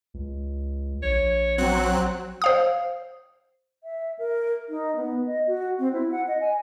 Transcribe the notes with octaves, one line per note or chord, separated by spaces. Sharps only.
C#2
A#1 C#5
F#3 C4 F#4 F#6
C5 F5 D#6
E5
A#4
D#4
B3
D#5
F#4
C4
E4
F#5
D#5
G#5